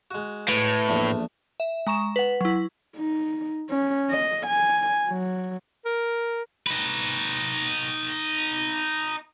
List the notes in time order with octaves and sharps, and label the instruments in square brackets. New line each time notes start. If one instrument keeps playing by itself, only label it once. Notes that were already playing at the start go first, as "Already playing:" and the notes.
[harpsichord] G#3 F#4
[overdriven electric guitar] A2 [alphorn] B4
[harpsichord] A#1 E2 A3
[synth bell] E5
G#3 A#5 C#6 E7
B4 F#5
F#3 E4
[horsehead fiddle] D#4
C#4
D#5
G#5
F#3
[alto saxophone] A#4
[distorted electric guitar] D#4 B4